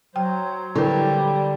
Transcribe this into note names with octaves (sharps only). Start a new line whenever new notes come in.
F#3 C5 G5
D3 G3 E4 A#4 B4